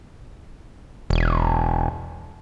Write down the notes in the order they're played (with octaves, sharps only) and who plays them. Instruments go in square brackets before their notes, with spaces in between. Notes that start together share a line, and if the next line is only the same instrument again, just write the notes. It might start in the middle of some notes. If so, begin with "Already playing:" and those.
[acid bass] E1